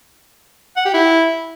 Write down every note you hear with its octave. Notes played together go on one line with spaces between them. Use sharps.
F#5
G4
E4